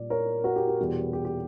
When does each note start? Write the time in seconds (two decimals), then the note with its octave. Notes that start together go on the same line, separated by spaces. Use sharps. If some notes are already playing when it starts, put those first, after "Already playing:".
Already playing: A#2 G3 D5
0.10 A#4 C#5
0.44 F#4 A#4
0.56 G4
0.67 G4
0.79 E2 B2 G3
1.13 G4
1.25 G4